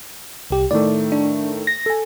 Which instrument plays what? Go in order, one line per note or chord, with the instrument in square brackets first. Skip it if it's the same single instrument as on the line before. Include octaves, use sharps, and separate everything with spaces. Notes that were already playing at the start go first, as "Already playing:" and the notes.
[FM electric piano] C2 G4
[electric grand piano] A2 D#3 A3 [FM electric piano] D5
[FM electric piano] D4
A#6
[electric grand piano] A4 G#5